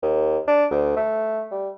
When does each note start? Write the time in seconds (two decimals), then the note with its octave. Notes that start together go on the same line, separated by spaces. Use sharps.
0.03 D#2
0.48 D4
0.71 D2
0.96 A3
1.51 G3